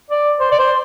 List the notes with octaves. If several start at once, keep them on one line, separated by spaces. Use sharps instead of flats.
D5
C5
D5
C5